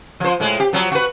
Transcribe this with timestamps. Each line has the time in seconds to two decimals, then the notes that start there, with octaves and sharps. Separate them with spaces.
0.20 F3 C5
0.40 A2 G#3
0.60 G4
0.73 F3 F#3
0.92 F#4 B4